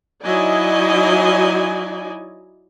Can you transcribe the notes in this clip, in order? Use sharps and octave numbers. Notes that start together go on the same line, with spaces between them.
F#3 D#4 E4 D5 D#5 G#5